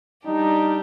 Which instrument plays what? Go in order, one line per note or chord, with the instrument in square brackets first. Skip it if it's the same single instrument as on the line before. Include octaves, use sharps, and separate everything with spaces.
[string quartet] G3 D4 G4 [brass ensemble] D#4